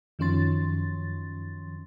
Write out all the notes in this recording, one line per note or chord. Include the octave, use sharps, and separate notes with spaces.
F#2 D#3 F3 C#4 C6 A6